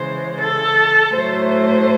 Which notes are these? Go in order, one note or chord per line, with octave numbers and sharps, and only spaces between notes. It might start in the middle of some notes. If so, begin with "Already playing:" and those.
Already playing: C#3 E3 G#3 C5
A4
A2 F#3 A3 C5